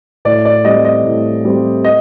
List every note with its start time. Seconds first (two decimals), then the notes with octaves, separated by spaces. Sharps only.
0.25 A2 D5
0.45 D5
0.65 G3 C4 D#5
0.85 D#5
1.05 A2
1.45 G3 C4
1.84 D#5